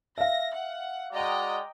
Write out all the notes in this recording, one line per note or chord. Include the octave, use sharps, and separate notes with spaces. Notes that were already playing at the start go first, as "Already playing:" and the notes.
E5 F5 A#6
F#5
G#3 F#4 D5 D#5 G5 A#5